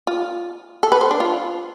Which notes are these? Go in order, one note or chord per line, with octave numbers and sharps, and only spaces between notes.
F4
A4
B4
C5
D4
F4